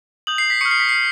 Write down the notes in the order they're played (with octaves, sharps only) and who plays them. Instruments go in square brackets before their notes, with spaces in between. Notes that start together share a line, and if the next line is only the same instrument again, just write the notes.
[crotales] D#6 G6 F#7
C7
B6
C#6 F6 C#7
C7
B6
C7
F6